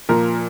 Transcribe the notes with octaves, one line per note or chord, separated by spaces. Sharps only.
A#2 F3 A#4